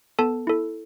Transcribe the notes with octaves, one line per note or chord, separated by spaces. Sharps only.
B3 A4 A5
E4 A4